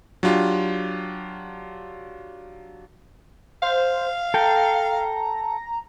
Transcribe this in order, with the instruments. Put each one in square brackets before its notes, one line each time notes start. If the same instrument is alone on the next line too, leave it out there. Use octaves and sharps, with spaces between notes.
[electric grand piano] F#3 D4 F4 G4
[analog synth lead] C5 [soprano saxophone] F5
[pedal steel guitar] A4 G5 [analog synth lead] A#5